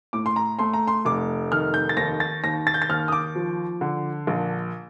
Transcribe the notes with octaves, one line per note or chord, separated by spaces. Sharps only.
A2 D6
C6
A#5
A3 C6
A#5
C6
F1 D6
D#3 F6
G6
A6
D#2 A#6
A6
D#2 A#6
A6
G6
A6
D#2 F6
D#6
D6
F3
D3
A#1